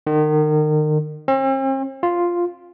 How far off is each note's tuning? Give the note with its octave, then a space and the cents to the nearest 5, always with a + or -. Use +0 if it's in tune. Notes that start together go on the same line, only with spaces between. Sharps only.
D#3 -35
C4 +45
F4 +0